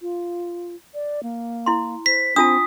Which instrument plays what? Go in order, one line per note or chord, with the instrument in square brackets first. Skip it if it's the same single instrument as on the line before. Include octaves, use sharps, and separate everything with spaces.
[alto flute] F4
D5
A#3
[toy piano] E4 C6
[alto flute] C5 [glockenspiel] B6
[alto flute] C4 [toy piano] D4 F4 A5 [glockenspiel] D#6